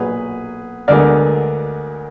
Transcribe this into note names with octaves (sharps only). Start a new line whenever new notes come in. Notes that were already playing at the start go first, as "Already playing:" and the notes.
Already playing: B1 A#2 F#3 G#4 B4
D2 D3 G#3 B3 A#4 D5